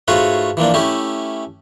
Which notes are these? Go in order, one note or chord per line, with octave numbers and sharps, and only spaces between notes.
G#2 A3 F4 F#4 B4 C#5
E3 F3 A#3 D4
A3 C#4 E4 G4